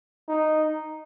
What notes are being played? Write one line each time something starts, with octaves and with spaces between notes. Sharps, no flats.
D#4